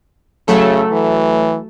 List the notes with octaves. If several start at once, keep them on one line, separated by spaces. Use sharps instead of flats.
C#3 F#3 A3 A4
E3